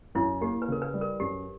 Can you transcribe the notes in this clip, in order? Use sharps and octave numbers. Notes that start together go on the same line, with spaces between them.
F#2 E4
A#3 G4
B4
C#3 A#4
B4
G3
A#4
F#2 G4